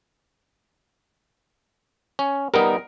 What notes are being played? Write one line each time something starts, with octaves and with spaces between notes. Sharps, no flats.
C#4
G3 B3 D#4 A#4